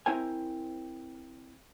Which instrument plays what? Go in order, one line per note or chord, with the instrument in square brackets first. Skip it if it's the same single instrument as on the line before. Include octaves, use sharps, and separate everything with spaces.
[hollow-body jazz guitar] C4 E4 A#4 C5 G#5